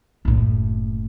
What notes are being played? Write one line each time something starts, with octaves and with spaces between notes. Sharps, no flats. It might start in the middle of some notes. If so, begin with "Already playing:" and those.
F#1 A2